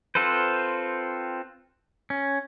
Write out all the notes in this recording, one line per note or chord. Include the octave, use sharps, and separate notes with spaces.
C4 F4 A4 B4 C5
C#4